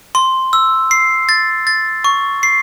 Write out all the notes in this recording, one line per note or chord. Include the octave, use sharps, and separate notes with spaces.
C6
E6
C7
A6
A6
C#6
C7